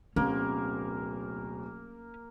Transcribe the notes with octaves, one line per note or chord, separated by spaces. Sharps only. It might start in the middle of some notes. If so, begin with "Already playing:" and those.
D1 B2 A#3 C4 C#4